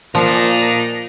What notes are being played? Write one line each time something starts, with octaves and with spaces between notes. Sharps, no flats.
A#2 F3 D4 D#4 A#5